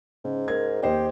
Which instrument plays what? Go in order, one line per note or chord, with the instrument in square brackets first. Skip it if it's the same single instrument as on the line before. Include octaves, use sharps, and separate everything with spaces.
[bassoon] G#2 [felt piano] C#3
[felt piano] A#4 G#6
[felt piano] D#2 C5 D#5 [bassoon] G4